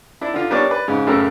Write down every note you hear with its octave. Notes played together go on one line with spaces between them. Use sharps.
D4 E4
D3 F4
G3 B3 D4 A#4 C#5 D5
B4 D5
G#2 C#3
F#2 A2 C#3 A3 A#4 E6